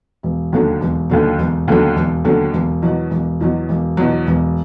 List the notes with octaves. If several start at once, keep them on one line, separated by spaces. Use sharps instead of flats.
E1
D#2 D3 F#3
E1
D#2 D3 F#3
E1
D#2 D3 F#3
E1
D#2 D3 F#3
E1
E2 B2 F#3
E1
E2 B2 F#3
E1
E2 B2 F#3
E1